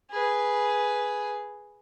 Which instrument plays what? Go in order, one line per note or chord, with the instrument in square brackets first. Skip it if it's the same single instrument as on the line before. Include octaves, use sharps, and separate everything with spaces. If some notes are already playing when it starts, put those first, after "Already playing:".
[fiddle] G#4 B4